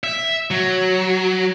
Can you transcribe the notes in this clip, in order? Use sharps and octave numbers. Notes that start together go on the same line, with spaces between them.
E5
F#3